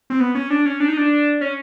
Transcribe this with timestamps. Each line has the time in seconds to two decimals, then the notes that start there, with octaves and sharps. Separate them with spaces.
0.10 C4
0.20 B3
0.35 C#4
0.50 D4
0.65 C#4
0.80 D4
0.88 D#4
0.97 D4
1.41 C#4